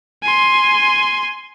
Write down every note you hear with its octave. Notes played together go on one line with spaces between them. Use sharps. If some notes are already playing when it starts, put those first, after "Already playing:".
G#5 C6